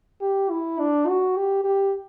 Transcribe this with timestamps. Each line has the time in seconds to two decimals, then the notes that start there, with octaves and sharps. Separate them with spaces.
0.21 G4
0.50 E4
0.79 D4
1.08 F#4
1.37 G4
1.64 G4